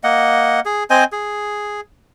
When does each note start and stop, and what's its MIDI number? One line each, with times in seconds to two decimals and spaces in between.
0.04 0.60 58
0.04 0.60 75
0.04 0.60 78
0.65 0.84 68
0.90 1.04 60
0.90 1.04 72
0.90 1.04 75
0.90 1.04 80
1.12 1.81 68